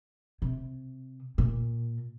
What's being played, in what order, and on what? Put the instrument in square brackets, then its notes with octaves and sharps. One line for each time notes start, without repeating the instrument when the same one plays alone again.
[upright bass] C3
A#2